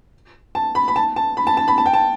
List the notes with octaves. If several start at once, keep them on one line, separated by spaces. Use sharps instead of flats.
A5
B5
B5
A5
A5
B5
A5
A5
B5
A5
G5
A5